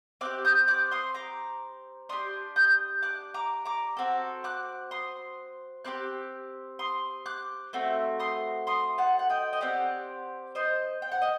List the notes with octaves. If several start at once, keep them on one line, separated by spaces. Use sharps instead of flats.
C4 G4 D6 F#6
D#6 G6
D6 F#6
C6 D#6
A#5 D6
D4 G4 C6 D#6
D#6 G6
D6 F#6
A#5 D6
A#5 D6
C4 F#4 A4
D6 F#6
C6 D#6
C4 G4 D6 F#6
C6 D#6
D6 F#6
A3 C4 F#4 A4
C6 D#6
C6 D#6
F#5 A5
F#5
D#5 G5
D#5
C4 G4 D5 F#5
C5 D#5
G5
F#5
D#5